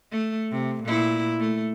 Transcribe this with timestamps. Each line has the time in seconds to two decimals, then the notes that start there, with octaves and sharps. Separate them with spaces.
0.12 A3
0.52 C3
0.84 A#2 E4
1.40 A3